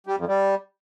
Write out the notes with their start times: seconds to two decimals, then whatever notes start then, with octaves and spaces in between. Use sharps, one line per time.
0.07 G3
0.17 F2
0.28 G3